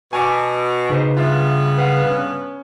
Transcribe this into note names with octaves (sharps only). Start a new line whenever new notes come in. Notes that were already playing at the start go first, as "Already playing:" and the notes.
B2 G#5 A5 D6
C#3 D#4 B4 C5
G2 B3 F4 E5
B4 F5 F#5
C#4